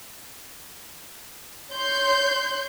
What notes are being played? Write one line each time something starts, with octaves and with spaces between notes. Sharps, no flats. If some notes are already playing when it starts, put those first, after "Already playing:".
C#5 C6 G6